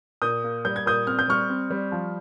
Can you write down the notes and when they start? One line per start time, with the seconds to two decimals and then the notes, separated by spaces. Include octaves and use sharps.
0.22 A#2 D#6 G6
0.44 A#3
0.65 G3 G6
0.76 G#6
0.86 A#2 D#6 G6
1.07 C4 F6
1.19 G6
1.28 G3 C#6 F6
1.49 C4
1.70 G3
1.92 F3